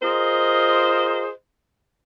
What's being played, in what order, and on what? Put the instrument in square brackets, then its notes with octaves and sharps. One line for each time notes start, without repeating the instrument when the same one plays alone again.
[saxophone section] F4 G#4 A#4 C5 D#5